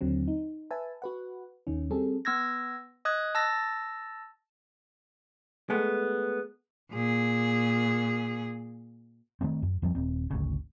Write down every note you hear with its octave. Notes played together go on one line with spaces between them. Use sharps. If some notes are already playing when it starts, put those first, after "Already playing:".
D#2 D3 F#3 C4
D#4
B4 E5 G#5 A5
F#4 B4 F#5
D#2 D#3 C#4
G3 C4 G#4 A4
B3 E6 G#6 A#6
D#5 D#6 F#6 G#6
A5 E6 A6 A#6
G#3 A3 B3
A#2 G#4
D#3 E3 A3 C4
F#2
F2 F3 G3 C4
D#1 C4
G#1 D2 C#3